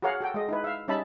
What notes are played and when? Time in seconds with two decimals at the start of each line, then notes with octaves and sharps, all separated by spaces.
0.02 F#4 G#4 A#4 C#5 F5 F#5
0.21 F#4 A4 G5
0.34 G#3 D#5
0.49 D#4 E4 B4
0.64 E5 F5
0.88 G3 C#4 D#4 E5 A5 B5